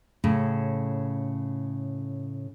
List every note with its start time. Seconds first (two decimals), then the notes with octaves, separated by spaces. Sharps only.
0.24 A2 C#3